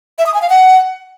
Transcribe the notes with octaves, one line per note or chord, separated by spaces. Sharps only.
E5
D#6
G#5
F5
F#5